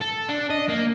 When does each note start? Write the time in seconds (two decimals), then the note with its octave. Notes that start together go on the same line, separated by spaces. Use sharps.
0.01 A4
0.29 D4
0.50 D#5
0.69 A#3